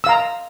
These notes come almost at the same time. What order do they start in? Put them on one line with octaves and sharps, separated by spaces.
E6 F5 A#5